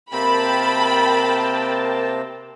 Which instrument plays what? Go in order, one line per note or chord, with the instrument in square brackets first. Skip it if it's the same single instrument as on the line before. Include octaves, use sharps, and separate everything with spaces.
[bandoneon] C3 A#3 C4 [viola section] A#4 G5 A5 [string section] B5